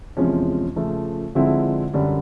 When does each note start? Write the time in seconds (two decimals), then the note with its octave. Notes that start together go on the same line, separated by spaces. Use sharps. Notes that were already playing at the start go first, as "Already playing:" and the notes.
0.17 E2 C3 F3 G#3 C#4
0.76 C#3 F3 A3
1.35 D3 F3 G#3 C4 E4
1.94 F#2 D3 G3